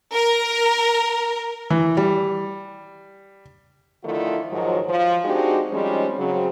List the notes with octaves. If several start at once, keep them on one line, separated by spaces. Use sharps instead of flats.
A#4
E3
G3
D3 D#3 F3 A3 E4 F4
G#2 D#3 F3 F#3
F3
G#3 C4 D4 D#4 F#4 G4
F3 G3 G#3 C4 C#4 D#4
C#3 F#3 C4